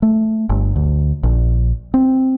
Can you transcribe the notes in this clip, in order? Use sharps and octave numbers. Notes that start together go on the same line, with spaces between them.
A3
G1
D2
A#1
C4